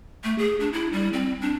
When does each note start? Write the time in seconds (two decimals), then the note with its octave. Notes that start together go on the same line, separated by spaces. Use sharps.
0.24 A3
0.38 G#4
0.60 D4
0.73 E4
0.93 G3
1.13 C4
1.42 D4